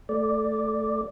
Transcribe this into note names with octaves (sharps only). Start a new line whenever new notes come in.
A3 D5